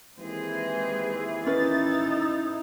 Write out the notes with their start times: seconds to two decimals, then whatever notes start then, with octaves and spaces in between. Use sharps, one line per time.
0.20 D#2 E3 G#3 C4 G#4
1.46 C#4 D#4 E4 B4 A6